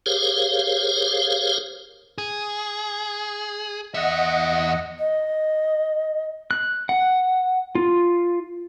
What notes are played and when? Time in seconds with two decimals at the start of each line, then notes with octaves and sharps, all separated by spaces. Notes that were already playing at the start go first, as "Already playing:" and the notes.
0.06 G4 G#4 A#4 C5 C#5 F5
2.18 G#4
3.94 E2 D#5 E5 F#5
4.99 D#5
6.51 F#6
6.89 F#5
7.75 F4